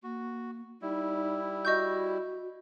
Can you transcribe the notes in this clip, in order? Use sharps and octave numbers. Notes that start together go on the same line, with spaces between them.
A#3 F#4
G3 D#4 E4
F#4 D#5 C#6 G6